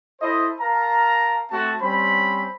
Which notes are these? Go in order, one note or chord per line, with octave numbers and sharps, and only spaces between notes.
E4 A4 C5 D#5
A#4 F5 A5 A#5
A3 C4 F#4 A5
G3 C4 C#4 C5 B5